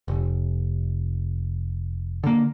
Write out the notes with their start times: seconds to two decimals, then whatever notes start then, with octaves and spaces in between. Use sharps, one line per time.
0.08 F1
2.24 D3 A#3